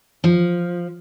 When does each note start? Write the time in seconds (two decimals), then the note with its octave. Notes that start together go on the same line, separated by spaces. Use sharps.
0.24 F3